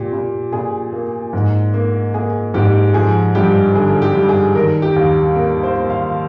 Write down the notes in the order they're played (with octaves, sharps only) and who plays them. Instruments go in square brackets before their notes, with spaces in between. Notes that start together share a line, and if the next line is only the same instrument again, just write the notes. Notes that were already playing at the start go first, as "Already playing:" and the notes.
Already playing: [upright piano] A#2 G4
A#2
A#2 G#4
A#3
G#2
A#3
A#3 G#4
G#2 G4
F3 G#4
G2 G4
D3 G#4
G4
G2
G#4
D#3 A#4
G4
D#2
A#3 A#4
C5
A#3
F5